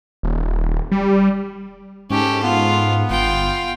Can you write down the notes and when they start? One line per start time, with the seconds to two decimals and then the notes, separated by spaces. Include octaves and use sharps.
0.23 D#1
0.92 G3
2.10 G#2 C#4 G4 A4
2.43 B3 F4
3.10 G1 F4 G5